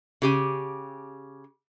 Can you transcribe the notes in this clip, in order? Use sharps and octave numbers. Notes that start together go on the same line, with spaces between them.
C#3 G4 G#5